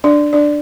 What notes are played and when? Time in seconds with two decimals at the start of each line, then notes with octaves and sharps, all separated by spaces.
0.04 D4 D5
0.33 D4 D5